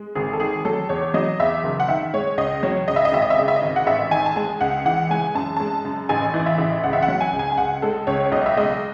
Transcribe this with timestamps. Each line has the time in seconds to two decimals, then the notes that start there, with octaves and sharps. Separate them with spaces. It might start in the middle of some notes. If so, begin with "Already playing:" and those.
Already playing: G#3
0.15 G#1 G#4
0.33 A4
0.40 D#3 G#4
0.65 F#3 A4
0.89 E2 C#5
1.14 F#3 D#5
1.39 E2 E5
1.64 F#1
1.80 F#5
1.88 D#3 E5
2.14 G#3 C#5
2.38 C#2 D#5
2.63 F#3 C#5
2.88 C#2 D#5
2.96 E5
3.05 D#5
3.12 G#1 E5
3.22 D#5
3.30 E5
3.37 C#3 D#5
3.48 E5
3.56 D#5
3.62 G#1
3.76 F#5
3.87 A1 E5
4.11 D#3 G#5
4.26 A5
4.36 G#3 G#5
4.61 C#2 F#5
4.85 E3 F#5
5.10 G#3 G#5
5.35 F#2 A5
5.57 G#3 A5
5.85 F#2
6.09 A1 G#5
6.34 E3
6.46 E5
6.58 A1
6.84 C#2 F#5
6.93 E5
7.02 F#5
7.08 F#3
7.21 G#5
7.33 C#2
7.39 G#5
7.52 G#5
7.57 C#2 F#5
7.82 G#3 A4
8.07 C#2 C#5
8.26 C#5
8.32 B1 D#5
8.46 E5
8.57 G#3 D#5